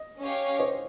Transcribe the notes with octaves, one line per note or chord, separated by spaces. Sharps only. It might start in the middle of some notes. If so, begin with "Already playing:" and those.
Already playing: D#5
C#4 G4 C#5 F5
C5 D#5